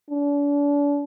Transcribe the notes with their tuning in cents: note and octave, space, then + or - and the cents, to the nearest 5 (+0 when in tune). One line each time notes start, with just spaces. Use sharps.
D4 -40